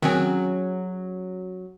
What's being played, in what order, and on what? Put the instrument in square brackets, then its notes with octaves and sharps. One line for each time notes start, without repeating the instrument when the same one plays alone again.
[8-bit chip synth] D#3 C4 [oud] F#3 C#4 G#4